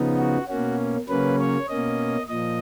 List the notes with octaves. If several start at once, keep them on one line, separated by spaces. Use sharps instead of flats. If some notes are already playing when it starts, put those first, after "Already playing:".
Already playing: C#3 F3 B3 D#4
F#4
B2 A#3 C#4 F#4
C#3 F#3 A#3 C#4 B4
C#5
B2 A#3 C#4 D#5
A#2 F3 D#5